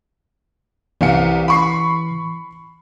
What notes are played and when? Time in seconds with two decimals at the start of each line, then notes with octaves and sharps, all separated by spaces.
1.01 C2 E3 F5 C#7
1.48 B5 C#6 C7